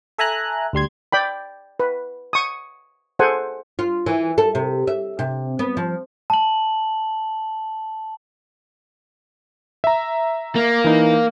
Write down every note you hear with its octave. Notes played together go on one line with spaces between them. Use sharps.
A4 E5 G#5 A#5 F#6
D2 G3 C6 G#6
D5 G5 B5
B4
C#6 D#6
G#4 A4 C5 F#5 G#5
F4
E3
A4
C3
E5
C3
B3
F3
A5 F#7
E5 A#5
A#3
E3 D#4